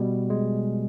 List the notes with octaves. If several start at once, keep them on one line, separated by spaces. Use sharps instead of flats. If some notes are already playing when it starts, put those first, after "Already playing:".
Already playing: B2 G3
G#3